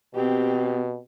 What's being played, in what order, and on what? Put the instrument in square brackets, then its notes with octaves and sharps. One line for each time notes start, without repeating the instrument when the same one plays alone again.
[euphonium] B2 [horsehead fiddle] C4 G4